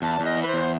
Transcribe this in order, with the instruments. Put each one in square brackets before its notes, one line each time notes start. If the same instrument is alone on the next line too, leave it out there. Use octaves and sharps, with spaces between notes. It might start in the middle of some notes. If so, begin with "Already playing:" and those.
[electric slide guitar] E2 [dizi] A5
[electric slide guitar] E2 [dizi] D#5
[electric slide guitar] E3
[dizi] B4
C5
[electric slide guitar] E2